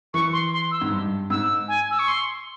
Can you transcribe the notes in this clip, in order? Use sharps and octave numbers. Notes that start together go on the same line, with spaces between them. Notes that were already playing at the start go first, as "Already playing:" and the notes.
E3 C#6
C6
C6
E6
G#2
G2
G#2 E6
G#5
E6
C#6
C6